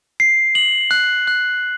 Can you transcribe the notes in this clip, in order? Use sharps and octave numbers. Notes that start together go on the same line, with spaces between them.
C7
F#7
F#6
F#6